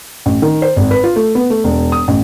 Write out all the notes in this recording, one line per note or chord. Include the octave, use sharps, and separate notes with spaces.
A1
D#3
C5
G#1
B4
F4
A3
B3
A3
E1
D#6
A1